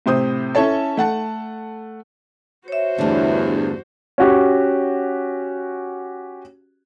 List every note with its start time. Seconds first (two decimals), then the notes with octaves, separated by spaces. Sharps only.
0.06 A2 C3 C5 D#6
0.55 C#4 E4 A4 C#5 A5
0.97 A3 F#5 A5
2.68 F#4 C5 C#5 E5
2.98 E2 G2 D3 A3
4.18 C#4 F#4 G4